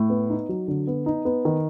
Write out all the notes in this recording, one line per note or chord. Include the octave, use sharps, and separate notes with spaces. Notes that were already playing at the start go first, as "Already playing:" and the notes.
Already playing: A2
B3
D#4
F#3
D3
B3
D#4
B3
D#3